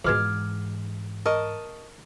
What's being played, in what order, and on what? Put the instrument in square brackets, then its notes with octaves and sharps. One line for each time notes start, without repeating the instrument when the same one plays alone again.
[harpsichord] F2 B2 G#3 [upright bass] G#2 E3 [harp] D6 F6 G#6
[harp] A#4 [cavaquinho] D#5 A5 C#6